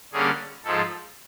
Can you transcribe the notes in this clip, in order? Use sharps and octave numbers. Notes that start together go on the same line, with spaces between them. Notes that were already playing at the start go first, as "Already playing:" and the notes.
D3 G3 A#3 C#4 G#4
G#2 F3 G#3 A4